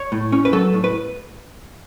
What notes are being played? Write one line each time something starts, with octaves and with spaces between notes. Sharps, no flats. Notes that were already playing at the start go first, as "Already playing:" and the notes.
Already playing: C#5
A2
C#4
B4
F#3 A4
A2
B4